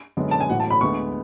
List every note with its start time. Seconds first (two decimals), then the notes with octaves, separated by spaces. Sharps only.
0.17 F#2 D3 G#3 B3
0.31 A5
0.40 G#5
0.49 A1 A2 F#3 F#5
0.60 A5
0.70 B5
0.81 D2 D3 G#3 B3 C#6